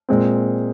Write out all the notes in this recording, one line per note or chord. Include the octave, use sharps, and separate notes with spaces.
A#2 G#3 C4